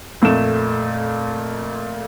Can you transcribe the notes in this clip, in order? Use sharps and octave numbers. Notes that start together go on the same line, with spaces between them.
F2 A#2 A3 E7